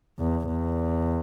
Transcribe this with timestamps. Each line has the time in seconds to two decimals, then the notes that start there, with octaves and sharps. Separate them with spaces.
0.19 E2
0.48 E2